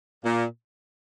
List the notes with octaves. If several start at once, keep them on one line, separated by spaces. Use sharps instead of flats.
A#2